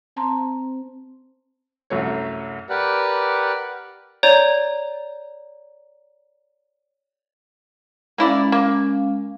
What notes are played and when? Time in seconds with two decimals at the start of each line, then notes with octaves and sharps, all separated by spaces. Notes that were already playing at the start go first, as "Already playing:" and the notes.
0.17 C4 A5 A#5 C6
1.90 C2 F#2 A3 F#4 C#5
2.70 G4 A#4 B4 D5 F#5
4.23 C#5 D5 A#5 G6
8.18 G#3 A#3 C#4 E4 D5 F5
8.52 A#3